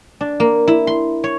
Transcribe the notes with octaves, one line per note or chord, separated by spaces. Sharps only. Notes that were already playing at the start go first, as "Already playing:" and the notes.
D4
A#3
E4
C6
C#5